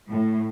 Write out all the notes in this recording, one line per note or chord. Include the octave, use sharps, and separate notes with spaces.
A2